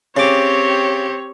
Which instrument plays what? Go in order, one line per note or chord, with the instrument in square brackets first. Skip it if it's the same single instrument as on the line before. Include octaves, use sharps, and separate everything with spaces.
[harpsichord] C#3 D6 [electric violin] C4 G4 [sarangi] C#5